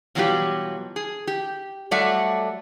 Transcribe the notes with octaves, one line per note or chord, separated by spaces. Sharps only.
B2 E3 F#3 G3 F4 G4
G#4
G4
F#3 G3 A3 D5 E5 F#5